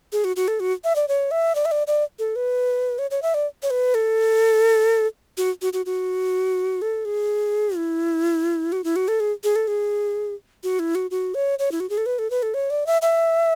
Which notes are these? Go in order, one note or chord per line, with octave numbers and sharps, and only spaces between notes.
G#4
F#4
F#4
A4
F#4
E5
D5
C#5
E5
D5
E5
D5
D5
A4
B4
C#5
C#5
E5
D5
C#5
B4
A4
F#4
F#4
F#4
F#4
A4
G#4
E4
F#4
E4
F#4
A4
G#4
G#4
A4
G#4
F#4
E4
F#4
F#4
C#5
C#5
E4
F#4
G#4
A4
B4
A4
B4
A4
C#5
D5
E5
E5